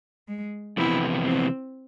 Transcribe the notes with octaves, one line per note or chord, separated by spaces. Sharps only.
G#3
F2 C3 E3 B3 E4
C4